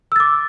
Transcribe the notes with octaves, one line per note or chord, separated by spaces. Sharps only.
D6 E6 A6